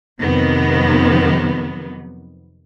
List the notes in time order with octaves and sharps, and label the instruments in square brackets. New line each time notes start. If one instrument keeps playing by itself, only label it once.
[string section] F2 C3 D#3 F#3 B3